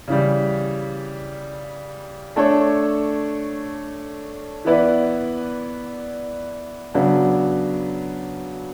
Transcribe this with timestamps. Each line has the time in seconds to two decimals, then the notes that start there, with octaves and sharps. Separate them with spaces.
0.08 C#3 E3 G3
2.36 A3 D4 A4 C#5
4.65 E3 B3 E4 B4 D5
6.94 C#3 F#3 B3 D4